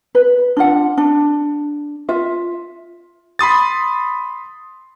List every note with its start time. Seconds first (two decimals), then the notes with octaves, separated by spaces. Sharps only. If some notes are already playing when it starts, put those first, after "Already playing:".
0.15 B4
0.57 D4 F4 F#5
0.97 D4
2.09 F4 E5
3.39 B5 C6 D#6 A6